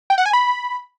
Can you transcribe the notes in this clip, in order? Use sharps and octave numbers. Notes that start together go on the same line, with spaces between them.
G5
F#5
G#5
B5